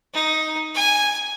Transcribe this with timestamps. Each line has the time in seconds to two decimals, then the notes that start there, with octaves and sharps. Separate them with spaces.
0.13 D#4
0.74 G#5